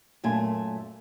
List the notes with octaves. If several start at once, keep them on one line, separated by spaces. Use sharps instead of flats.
F#2 A#2 A3 G#5